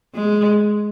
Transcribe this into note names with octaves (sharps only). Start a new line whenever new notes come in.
G#3